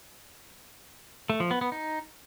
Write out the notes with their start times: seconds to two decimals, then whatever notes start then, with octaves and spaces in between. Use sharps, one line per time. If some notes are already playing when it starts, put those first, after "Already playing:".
1.30 A3
1.40 F3
1.51 B3
1.61 B3
1.72 D#4